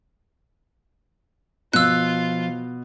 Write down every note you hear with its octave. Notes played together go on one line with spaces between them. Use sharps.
B2 F3 F4 E6 F#6